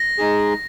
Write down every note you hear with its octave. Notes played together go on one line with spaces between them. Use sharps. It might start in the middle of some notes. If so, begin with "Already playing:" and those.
Already playing: A#6
G#3 D#4 G#4